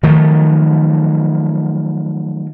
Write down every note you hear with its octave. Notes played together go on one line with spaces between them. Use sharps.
D#3 F3 F#3 A3